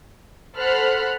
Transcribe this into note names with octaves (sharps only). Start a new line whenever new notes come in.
A4 C5 F#5 B5 F6 F#6